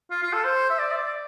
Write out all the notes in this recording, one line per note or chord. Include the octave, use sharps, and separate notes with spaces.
F4
F4
A4
C5
E5
D5
E5
D5